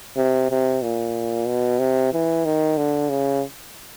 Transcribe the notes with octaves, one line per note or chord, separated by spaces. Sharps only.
C3
C3
A#2
B2
C3
E3
D#3
D3
C#3